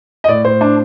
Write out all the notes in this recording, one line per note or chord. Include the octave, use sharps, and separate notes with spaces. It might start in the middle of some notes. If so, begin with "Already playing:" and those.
D#5
A2 D5
A2 C5
D4